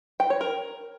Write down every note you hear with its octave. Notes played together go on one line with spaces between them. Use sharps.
G5
C#5
A#4